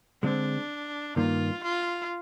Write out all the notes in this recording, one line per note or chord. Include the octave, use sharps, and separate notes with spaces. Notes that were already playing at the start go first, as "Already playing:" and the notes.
D3 G#3 C4 D4
G2 D#3 A#3 F4
F4